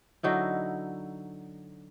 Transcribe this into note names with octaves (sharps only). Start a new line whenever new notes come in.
D3 F#3 D#4 E4